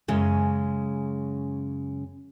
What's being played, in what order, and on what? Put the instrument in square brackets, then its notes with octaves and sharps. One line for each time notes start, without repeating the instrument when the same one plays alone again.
[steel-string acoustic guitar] F#2 C#3 G#3